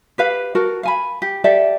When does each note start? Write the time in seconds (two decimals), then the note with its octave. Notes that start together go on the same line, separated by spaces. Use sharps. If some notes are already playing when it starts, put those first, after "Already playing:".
0.18 G4 B4 F5
0.55 F#4 A4 A#4
0.83 F5 G#5 B5
1.22 G4
1.44 G4 A4 D5 E5